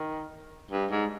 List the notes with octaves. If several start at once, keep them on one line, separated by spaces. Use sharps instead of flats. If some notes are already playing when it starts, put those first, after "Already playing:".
Already playing: D#3
G2
G#2